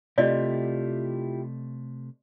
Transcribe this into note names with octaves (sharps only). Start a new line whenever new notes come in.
C3 A3 E4 F4 G4 D5 D#5